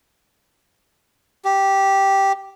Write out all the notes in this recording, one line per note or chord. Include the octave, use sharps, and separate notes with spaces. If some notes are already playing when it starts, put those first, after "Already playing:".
G4